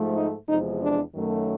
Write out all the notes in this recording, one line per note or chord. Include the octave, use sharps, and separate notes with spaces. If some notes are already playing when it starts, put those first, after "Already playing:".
Already playing: G#2 F3 A3
D#4
E2 C3 F3 G#3 D#4
D4
F#2 D#3 F#3 A3